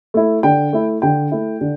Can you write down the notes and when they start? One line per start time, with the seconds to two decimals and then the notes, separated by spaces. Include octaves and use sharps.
0.14 A3 E4
0.43 D3 G5
0.73 A3 E4
1.02 D3 G5
1.32 A3 E4
1.61 D3